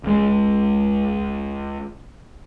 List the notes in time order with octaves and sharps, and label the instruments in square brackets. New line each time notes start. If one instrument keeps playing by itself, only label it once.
[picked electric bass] C#2 G#3